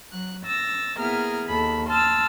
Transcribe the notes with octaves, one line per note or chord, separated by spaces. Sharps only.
F#3 F#6
E6 A6 A#6
A#3 B3 E4 G#4 A#4 F6
D#2 A4 B5
A5 C6 E6 F6 A6